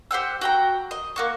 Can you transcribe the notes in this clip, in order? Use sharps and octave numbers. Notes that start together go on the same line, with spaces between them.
G4 C5 F#5 E6
F#4 G5 A#5
D#5
A#3 F#4 C#6